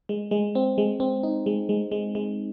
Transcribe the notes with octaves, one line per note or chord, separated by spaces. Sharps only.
G#3
G#3
C4
G#3
C4
D#4
G#3
G#3
G#3
G#3